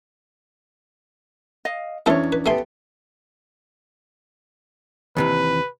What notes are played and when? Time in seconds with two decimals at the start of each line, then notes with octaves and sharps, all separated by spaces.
1.65 D#5 F5
2.06 E2 A3 C#4 D4 A4 C5 C#5
2.32 B4
2.46 A3 B3 G4 A4 G#5 C6
5.17 D#2 C3 E3 B4